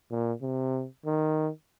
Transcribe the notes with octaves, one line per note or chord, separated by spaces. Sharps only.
A#2
C3
D#3